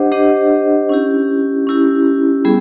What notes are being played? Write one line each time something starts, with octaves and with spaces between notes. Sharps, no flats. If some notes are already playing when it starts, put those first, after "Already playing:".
Already playing: D4 G4 C5 D#5 F#5
D4 G4 C5 D#5 F#5
C#4 E4 G4
C#4 E4 G4
G3 B3 E4 G#4